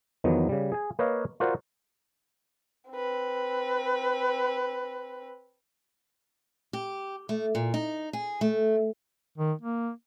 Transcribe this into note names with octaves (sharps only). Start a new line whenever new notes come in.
E2 D#3 F3 F#3 B3
C#3 G3
G#4 G#5
A#3 B4 C#5 D#5 F5
F4 F#4 A#4 C5 D5 F#5
C4 B4
G4
A3
A#2
D#4
G#4
A3
D#3
A#3